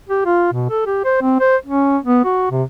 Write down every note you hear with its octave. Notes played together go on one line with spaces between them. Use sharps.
G4
F4
B2
A4
G4
C5
C4
C5
C#4
B3
F#4
C3